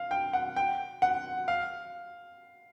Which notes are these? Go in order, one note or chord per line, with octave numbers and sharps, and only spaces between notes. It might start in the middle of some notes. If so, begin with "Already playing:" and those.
Already playing: F5
G5
F#5
G5
F#5
F5